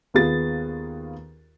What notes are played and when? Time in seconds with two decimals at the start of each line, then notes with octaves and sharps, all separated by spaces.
0.14 D#2 B3 F4 G#4 A6